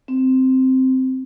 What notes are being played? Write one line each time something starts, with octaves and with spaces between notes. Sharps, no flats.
C4